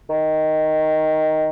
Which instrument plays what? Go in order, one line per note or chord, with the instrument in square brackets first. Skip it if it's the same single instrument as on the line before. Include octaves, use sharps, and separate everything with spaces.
[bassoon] D#3